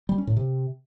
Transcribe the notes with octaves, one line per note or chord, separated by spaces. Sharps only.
G3
C#4
A2
C3